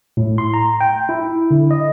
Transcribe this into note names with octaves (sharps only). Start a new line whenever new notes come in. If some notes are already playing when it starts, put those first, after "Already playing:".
A2
C6
A#5
G5
E4
D3
D#5